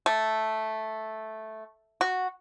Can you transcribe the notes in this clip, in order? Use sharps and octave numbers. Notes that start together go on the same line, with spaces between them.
A3
F#4